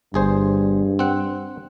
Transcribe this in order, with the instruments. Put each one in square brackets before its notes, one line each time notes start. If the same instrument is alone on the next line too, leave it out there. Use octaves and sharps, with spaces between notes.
[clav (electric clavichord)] G1 G#4 C5 [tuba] G2
[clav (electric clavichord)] C4 F#5